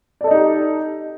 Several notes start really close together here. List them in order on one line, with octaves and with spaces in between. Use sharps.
D5 A4 D#5 D#4 G4